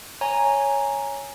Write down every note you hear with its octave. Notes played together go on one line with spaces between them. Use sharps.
C#5 G#5 A#5